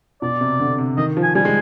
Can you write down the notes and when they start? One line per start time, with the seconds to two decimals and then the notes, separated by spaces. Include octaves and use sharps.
0.22 B2 D5
0.41 C3
0.60 D3
0.78 C3
0.97 D#3 D#5
1.17 F3
1.23 G#5
1.35 G3 G#5
1.45 G#3